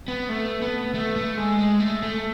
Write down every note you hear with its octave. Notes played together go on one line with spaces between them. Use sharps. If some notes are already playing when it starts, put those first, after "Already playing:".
B3
A3
B3
A3
A3
G#3
G#3
A3
A3